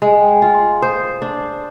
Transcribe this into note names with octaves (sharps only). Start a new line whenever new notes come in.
G#3 G#5
G5
G#5
F4
C6
C5 D#6
D4